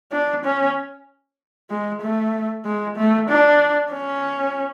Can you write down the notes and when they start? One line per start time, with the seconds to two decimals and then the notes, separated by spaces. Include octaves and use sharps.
0.12 D4
0.45 C#4
1.70 G#3
2.01 A3
2.65 G#3
2.96 A3
3.29 D4
3.92 C#4